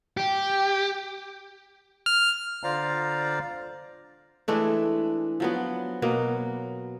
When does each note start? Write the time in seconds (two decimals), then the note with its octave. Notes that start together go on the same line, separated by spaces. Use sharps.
0.17 G4
2.06 F6
2.64 D3 F4 C5 D5 F5 A#5
4.48 E3 G#3 A3 D4
5.40 F3 F#3 B3
6.02 B2 F#3 A#3